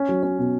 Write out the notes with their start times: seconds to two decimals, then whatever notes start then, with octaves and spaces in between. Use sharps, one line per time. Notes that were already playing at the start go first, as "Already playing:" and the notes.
Already playing: C#4
0.09 F#3
0.23 C#4
0.38 B2